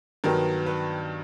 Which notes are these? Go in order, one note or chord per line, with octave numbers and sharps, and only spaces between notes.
G2 D#3 F#3 B3 A#4
B4